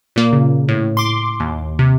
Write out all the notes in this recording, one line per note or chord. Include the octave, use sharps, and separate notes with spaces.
A#2 A#3
C#3
A2
C6 D6
D#2
C3